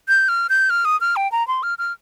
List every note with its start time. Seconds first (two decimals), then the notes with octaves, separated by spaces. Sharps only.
0.08 G6
0.29 F6
0.49 G6
0.70 F6
0.85 D#6
1.01 F6
1.16 G5
1.32 A#5
1.48 C6
1.63 F6
1.79 F6